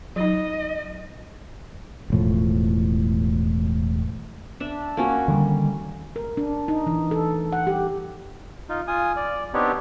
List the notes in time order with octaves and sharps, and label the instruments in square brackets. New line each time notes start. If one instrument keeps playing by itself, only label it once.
[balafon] F#3 D#4 [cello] D#5
[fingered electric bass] E1 A2 F3
[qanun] D4 E5
A#3 C#4 F#4
[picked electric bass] D3 D#3 G3
[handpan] A#4
D4
D#4
E3
A4
F#5
G4
[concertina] D#4 F4
F4 G#5 D#6
D5
B3 C4 D4 D#4 G4 C#5